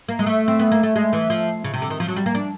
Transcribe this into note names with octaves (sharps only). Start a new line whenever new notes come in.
A#3
G#3
A3
C4
B3
A#3
A3
G#3
E3
F3
C#3
C3
D3
D#3
F3
F#3
G3
A#3
D4